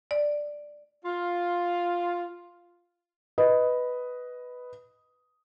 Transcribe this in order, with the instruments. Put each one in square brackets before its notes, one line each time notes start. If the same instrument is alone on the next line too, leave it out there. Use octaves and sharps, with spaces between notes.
[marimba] D5
[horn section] F4
[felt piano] B4 D#5